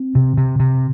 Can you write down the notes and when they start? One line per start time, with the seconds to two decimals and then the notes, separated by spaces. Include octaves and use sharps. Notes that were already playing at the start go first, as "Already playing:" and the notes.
Already playing: C4
0.15 C3
0.37 C3
0.60 C3